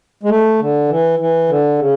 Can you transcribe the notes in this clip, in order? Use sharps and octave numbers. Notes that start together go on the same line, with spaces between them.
G#3
A3
D3
E3
E3
D3
C#3